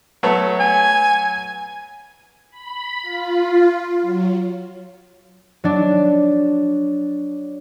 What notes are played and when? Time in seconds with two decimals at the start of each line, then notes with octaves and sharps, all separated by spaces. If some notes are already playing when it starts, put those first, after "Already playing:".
0.23 F#3 A3 B3
0.60 G#5
2.51 B5
3.02 F4
4.02 F#3
5.64 F#3 D4